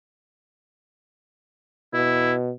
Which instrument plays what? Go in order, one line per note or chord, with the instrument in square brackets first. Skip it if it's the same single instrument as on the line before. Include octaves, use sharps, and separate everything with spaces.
[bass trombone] B2 [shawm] E4